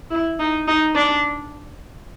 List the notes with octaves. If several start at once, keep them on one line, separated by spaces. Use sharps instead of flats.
E4
D#4
D#4
D4